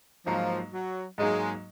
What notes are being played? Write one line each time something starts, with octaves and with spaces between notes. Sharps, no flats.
G#2 F3 F#3 A#3 D#4
F#3
G#2 F#3 G#3 A#3 D#4